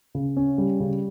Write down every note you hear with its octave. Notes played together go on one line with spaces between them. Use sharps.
C#3
C#4
G3
C#3